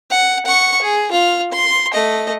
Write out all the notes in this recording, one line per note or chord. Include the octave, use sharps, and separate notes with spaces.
F#5
F#5 C#6
G#4
F4 F6
C6
A3 D#5